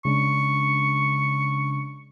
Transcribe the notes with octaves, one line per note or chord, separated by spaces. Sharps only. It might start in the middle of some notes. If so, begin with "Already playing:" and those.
C#3 G#3 D4 C#6